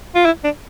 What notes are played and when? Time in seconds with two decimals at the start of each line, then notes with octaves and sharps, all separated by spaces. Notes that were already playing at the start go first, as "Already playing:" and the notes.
0.15 F4
0.25 E4
0.44 D4